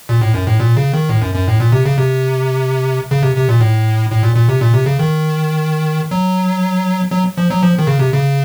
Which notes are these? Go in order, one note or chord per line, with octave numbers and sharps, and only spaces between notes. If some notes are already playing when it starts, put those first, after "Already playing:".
A#2
A2
F#2
A2
A#2
C#3
D#3
A2
F#2
F#2
A2
A#2
C3
C#3
C3
C#3
C3
C3
A#2
A2
A2
A#2
A#2
C3
A#2
C3
C#3
D#3
F#3
F#3
F3
F#3
F3
D#3
C#3
C3
C#3